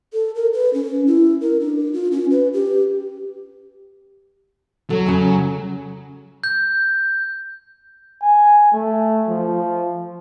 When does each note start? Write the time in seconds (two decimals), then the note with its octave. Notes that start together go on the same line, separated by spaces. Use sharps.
0.13 A4
0.35 A#4
0.53 B4
0.74 C#4
1.07 E4
1.41 A#4
1.60 D4
1.94 F4
2.12 C#4
2.31 B4
2.53 G4
4.90 F#3 A4 C#5
5.06 C#3 C#4
6.44 G6
8.22 G#5
8.73 A3
9.28 F3